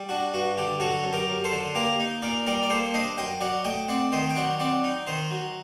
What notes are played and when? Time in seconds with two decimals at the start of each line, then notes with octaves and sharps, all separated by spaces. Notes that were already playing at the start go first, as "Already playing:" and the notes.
Already playing: G3
0.09 D4 F#4
0.33 G2 F#4
0.57 D3 G4
0.80 F#3 F#4 A4
1.04 F#2
1.13 G4 A#4
1.29 F#2
1.44 A4 C5
1.52 D3
1.75 A#3 G4 A#4
2.00 D#4
2.22 A#2 A#4 D5
2.46 G3 A#4 D5
2.63 D5
2.70 A#3 A4 C5
2.94 D4 C5 D#5
3.17 F#2 D#5 G5
3.41 F#3 D5 F#5
3.64 A3 D#5 G5
3.88 C4 D5 F#5
4.12 D#3 C5 D#5
4.30 G5
4.35 F#3 D5 F#5
4.59 C4 D5 F#5
4.84 D#4
5.07 D#3 C5 D#5
5.30 F#3